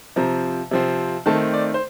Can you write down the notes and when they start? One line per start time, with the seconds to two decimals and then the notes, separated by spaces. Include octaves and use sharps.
0.16 C3 F3 C4 A#5
0.71 C3 F3 C4
1.26 D#3 A3 C4 A5
1.53 D5
1.74 C5